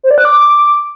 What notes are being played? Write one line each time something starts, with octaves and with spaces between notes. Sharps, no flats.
C5
D5
F#6
D6